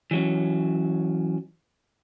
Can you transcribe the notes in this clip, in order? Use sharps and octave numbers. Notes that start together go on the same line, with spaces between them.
E3 F#3 C#4